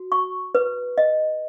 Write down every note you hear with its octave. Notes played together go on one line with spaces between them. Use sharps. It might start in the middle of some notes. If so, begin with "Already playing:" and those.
Already playing: F#4
C#6
B4
D#5